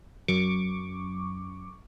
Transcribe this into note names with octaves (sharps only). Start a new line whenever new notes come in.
F#2 C#6 D6